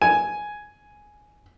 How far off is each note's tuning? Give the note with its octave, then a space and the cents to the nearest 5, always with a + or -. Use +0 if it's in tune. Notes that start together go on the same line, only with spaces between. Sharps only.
G#5 +5